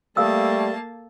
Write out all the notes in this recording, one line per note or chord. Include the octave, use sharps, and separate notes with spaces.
G3 A3 A#3 A4 F5 A5 E6